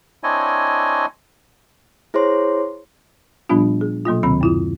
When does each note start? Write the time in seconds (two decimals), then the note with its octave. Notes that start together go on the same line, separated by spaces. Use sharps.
0.24 C4 D4 E4 C#5 D#5 G#5
2.14 E4 G#4 C5 C#5 C6
3.49 A#2 F3 G3 B3 D4 F4
3.81 G#4
4.05 B2 F#3 A#3 F4
4.23 D2 C3 D#3 F#3 C4 B5
4.41 F#2 E4 F4